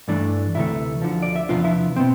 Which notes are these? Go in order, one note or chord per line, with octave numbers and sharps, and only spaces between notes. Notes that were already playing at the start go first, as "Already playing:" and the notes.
G2 E3 A3 D4 D5
D2 C3 E3 A3 E4 E5
D2 D3 F3
D5
E5
E2 C3 F3 B3 D4 F4 F5
E4 E5
B2 B3 C4 C5